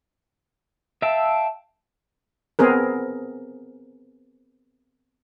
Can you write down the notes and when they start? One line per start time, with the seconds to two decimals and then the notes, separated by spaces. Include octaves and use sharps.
1.02 E5 F5 G5 A5 E6
2.59 B3 C4 G#4 A#4